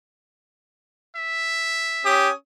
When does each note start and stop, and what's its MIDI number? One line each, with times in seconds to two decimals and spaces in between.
1.17 2.17 76
2.05 2.32 61
2.05 2.29 67
2.05 2.32 87